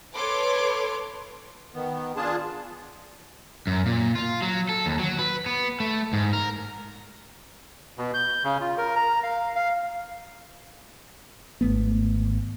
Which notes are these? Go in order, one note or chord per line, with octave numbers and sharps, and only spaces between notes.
A4 B4 C#5 C6 D6
D#3 B3
D4 F4 G#4 A5
F#2
A#2
F4
F#3
A4
D#2
F#3
B4
B3
A3
G#2
A#4
B2
G6
C#3
F4
A#4
A#5
F5
F5
G#1 A3 B3